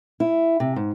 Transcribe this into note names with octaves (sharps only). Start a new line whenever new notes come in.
E4
C3
G#2